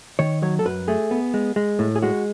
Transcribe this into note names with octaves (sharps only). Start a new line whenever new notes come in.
D#3 C#5
F#3 C#5
A4
F#2 B4
A3 G#4
B3
G#3
G#3
A2
G#4
G#3 F#4